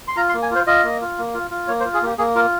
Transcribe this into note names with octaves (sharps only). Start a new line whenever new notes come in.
C6
F4 A#5
C6
A#3
G#5
F4 C5
F4 D#5
A#3
F4
A#3
F4
F4
A#3 C#5
C5
F4
G#4
A#3 G4
A#3 G#4
F4 A#4